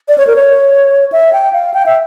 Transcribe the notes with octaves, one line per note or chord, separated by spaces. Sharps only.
D5
C#5
A#4
C#5
E5
G5
F5
G5
E5